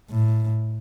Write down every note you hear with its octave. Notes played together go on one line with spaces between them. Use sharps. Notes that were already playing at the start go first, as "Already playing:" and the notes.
A2